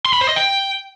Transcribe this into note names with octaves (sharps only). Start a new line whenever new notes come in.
C6
B5
C5
D#5
G5